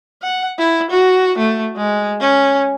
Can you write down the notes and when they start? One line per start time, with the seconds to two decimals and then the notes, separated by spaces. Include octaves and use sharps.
0.23 F#5
0.58 E4
0.91 F#4
1.38 A3
1.76 G#3
2.21 C#4